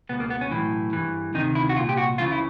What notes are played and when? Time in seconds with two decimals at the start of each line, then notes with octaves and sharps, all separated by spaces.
0.09 C#2 B2 B3
0.20 A#3
0.30 B3
0.41 C#4
0.51 B1 A2 E3
0.93 G2 E3
1.34 D2 C3 D#3 D#4
1.55 E4
1.69 F#4
1.76 C2 F4
1.80 A#2
1.89 G4
1.97 F#4
2.18 C#2 C#3 E3 F4
2.32 E4